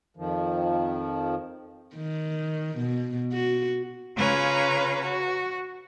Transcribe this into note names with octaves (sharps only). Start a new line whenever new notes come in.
F2 D#3 F3
D#3
B2
F#4
C#3 C#4 F4 B4 A#5 G#6
F#4